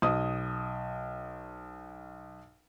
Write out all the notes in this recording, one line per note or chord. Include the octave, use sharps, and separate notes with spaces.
B1 D#5 D#6